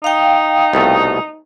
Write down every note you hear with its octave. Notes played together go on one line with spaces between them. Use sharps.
D#4 F5 G5
C2 B2 A3